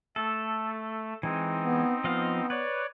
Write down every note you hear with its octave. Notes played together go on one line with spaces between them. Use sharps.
A3 A4
E3 G#3 C4 D#4
B3
F3 B3 D#5 F5
B4 C#5 D5